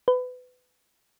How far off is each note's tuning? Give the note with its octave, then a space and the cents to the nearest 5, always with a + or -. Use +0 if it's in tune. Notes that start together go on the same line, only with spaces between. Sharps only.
B4 +25